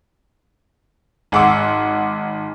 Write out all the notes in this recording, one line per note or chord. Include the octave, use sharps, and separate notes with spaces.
G#1 G#4 F#5 C6 D6 E6